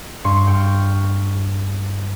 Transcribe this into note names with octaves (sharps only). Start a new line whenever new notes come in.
G2 C6 C#6
G5 C#6 F6